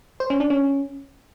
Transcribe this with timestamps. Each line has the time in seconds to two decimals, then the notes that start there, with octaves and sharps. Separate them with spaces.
0.20 C5
0.30 C#4
0.40 D4
0.50 C#4